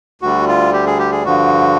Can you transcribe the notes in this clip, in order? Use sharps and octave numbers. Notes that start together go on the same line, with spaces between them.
D2 D3 G3 F#4
F4
G4
G#4
G4
G#4
G2 D3 F3 F#4